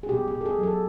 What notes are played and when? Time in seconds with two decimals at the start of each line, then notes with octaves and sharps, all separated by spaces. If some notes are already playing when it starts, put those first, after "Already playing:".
0.03 G#4
0.09 B2 G4
0.28 G4
0.34 B2
0.41 A4
0.46 G#4
0.58 F#3 A4